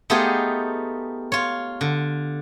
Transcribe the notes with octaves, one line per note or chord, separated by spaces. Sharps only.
A3 B3 D#4 F4 G4 G#4
F4 C#5
D3